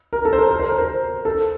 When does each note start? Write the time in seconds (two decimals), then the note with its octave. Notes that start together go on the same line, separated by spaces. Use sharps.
0.13 A#4
0.25 A4
0.33 C5
0.38 A#4
0.50 A#4
0.60 C5
0.69 A#4
0.78 C5
1.25 A4